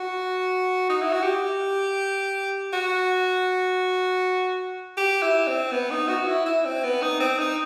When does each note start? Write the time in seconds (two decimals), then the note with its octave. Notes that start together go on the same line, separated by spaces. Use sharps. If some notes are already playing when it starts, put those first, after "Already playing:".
Already playing: F#4
0.89 D#4
1.02 E4
1.13 F#4
1.23 G4
2.73 F#4
4.97 G4
5.22 E4
5.47 C4
5.72 B3
5.90 D#4
6.08 F#4
6.27 E4
6.46 E4
6.65 C4
6.84 B3
7.02 D#4
7.20 C4
7.39 D#4